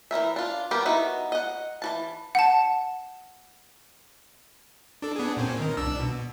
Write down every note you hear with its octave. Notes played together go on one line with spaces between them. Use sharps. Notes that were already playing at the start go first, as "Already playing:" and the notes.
E3 C#4 A#4 E5
D4 F4
G3 B3 G4 A#4
B3 D#4 E4 F#4
D#5 F#5
E3 F#4 A5
F#5 A5
D4 A4
B3 D4 G#4
A#2 C4 C#4
D#3 A#4
C2 D4 E6
B2